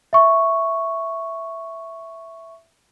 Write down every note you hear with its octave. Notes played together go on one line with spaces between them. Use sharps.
E5 C#6